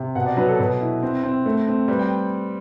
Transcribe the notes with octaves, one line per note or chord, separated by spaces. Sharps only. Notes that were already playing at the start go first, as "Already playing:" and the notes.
Already playing: C3
B2 F#5
D5
F#3 B4
A4
B2 B4
E4
C4
C4
A3
C4
G3 B4
G5